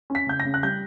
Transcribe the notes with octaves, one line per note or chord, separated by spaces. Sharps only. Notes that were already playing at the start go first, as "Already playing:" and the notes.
C#4
B6
C#3 G6
A#6
C#3
F#6
G3 G6